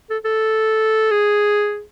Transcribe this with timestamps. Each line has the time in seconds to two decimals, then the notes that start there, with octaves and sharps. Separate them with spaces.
0.10 A4
0.25 A4
1.11 G#4